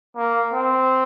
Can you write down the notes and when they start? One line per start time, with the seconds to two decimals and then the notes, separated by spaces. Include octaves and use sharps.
0.17 A#3
0.52 C4